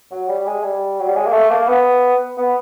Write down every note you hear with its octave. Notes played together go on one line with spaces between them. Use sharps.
F#3
G3
G#3
G3
F#3
G3
G#3
A#3
A3
A#3
B3
B3